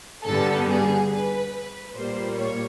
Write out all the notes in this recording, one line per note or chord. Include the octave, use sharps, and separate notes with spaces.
G2 D3 G3 B3 A4
G#4
B4
B4
A#2 G3 A#3 C5
C#5